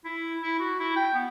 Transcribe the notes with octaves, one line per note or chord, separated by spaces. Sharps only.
E4
E4
F#4
E4
G5
B3